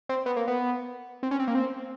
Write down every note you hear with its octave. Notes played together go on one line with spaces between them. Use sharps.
C4
B3
A#3
B3
C4
C#4
C4
A#3
C4